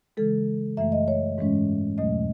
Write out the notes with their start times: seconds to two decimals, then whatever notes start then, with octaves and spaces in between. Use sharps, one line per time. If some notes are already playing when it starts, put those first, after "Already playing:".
0.17 C#3 E3 G#3 A4
0.77 F#2 E3 A3 E5
0.92 D#5
1.08 C#5
1.38 G#2 E3 G#3 C#4
1.98 E2 B2 F#3 A3 D#5